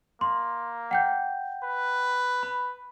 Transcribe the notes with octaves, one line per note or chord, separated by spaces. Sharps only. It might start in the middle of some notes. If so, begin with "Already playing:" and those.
A#3 C6
F#5 G5 G6
B4
B5